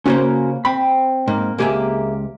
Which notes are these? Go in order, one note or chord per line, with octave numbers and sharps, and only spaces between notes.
C#3 A#3 C#4 F#4 C5 C#5
C4 B5
G#2 A#3
C#2 A#3 G4 G#4 E5